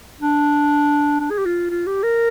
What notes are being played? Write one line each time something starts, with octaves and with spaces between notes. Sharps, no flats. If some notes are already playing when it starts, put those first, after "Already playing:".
D4
D4
G#4
G4
F4
F4
G4
A#4